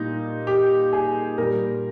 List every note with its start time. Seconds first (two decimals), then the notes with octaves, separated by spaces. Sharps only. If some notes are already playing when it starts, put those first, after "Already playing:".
Already playing: A#2 G3 D#4
0.47 G4
0.93 G#4
1.38 A#2 G3 A#4